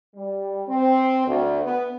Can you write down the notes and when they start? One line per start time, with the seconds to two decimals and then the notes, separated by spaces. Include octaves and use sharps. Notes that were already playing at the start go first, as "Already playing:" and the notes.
0.15 G3
0.67 C4
1.27 D2
1.63 B3